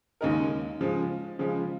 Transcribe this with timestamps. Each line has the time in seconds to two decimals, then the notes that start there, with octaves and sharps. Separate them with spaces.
0.21 D#2 C#3 G#3 D#4 A#4
0.81 C#3 F3 G#3
1.39 C#3 F3 G#3